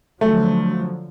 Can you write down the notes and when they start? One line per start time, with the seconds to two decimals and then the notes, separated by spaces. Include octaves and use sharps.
0.21 D3 F3 F#3 A3